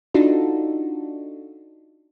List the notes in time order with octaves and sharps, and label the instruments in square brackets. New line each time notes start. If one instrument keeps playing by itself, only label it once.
[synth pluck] D4 D#4 F4 F#4 A4